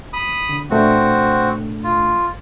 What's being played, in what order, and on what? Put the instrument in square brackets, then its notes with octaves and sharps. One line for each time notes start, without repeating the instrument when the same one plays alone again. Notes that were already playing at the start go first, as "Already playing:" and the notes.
[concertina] B5 D#6
[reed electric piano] D3
[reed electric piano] A#2 A3 D4 [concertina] C4 F#4
[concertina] F4